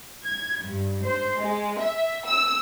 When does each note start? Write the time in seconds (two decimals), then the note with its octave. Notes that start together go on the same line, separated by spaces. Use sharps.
0.24 G#6
0.62 G2
1.05 C5
1.38 G#3
1.79 E5
2.26 E6